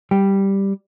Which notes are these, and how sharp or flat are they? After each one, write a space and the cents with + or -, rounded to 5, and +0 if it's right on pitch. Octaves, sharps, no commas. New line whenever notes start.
G3 +0 G5 +0